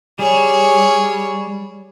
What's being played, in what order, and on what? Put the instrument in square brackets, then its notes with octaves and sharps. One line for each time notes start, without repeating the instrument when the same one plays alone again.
[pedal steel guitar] G3 [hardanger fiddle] G#4 C#5